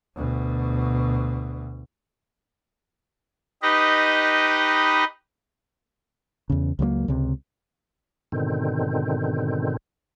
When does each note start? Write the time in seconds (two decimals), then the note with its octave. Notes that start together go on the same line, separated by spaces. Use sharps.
0.16 D2 B2
3.62 D#4 G4 B4 D#5
6.50 E2 C#3
6.79 C#2 F#3 G3 A#3
7.08 C#2 C3
8.32 G#2 B2 D3 D#3 C4